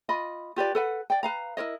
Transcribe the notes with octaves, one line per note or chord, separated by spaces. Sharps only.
F4 D#5 B5
F4 G4 B4 D5
A4 B4 F#5
D5 G5
B4 F5 A#5
E4 A#4 C#5 D#5